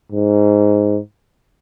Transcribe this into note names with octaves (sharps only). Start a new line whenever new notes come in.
G#2